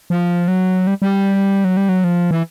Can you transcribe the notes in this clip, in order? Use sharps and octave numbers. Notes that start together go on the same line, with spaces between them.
F3
F#3
G3
G3
F#3
G3
F#3
F3
E3